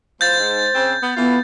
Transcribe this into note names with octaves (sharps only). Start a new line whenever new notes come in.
A2 F3 C5 G6 A6
G#2
C#3 C4
B3
E3 A3 B3 F4